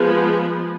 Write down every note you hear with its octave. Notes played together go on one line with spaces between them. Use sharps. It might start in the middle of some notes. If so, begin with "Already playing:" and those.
Already playing: F3 G#3 B3 G#4